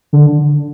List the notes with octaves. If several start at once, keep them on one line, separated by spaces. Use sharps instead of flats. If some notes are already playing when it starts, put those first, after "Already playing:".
D3